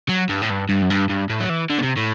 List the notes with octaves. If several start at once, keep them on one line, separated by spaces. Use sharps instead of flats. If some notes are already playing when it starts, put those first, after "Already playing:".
F#3
G2
A2
G2
G2
F#2
G2
G2
A2
F#3
E3
D3
B2
C3
A2